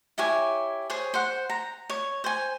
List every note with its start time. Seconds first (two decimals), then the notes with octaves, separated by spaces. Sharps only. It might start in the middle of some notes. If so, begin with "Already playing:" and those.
0.18 E4 G4 C#5 G#5
0.90 G#4 C5 C#5
1.14 C5 F#5
1.50 A#5
1.90 C#5
2.24 C5 G#5